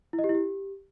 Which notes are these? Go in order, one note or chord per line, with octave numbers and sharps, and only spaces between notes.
E4
D#5
G4
E4
G4